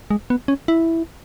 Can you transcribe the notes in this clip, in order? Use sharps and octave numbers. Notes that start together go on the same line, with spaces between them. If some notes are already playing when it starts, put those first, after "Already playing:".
G#3
B3
C#4
E4